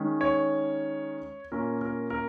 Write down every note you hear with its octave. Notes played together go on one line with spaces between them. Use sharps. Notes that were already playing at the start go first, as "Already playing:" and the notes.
Already playing: D#3 G#3 C#4
C#5
A#2 A#3 C#4 A#4
A#4
A#4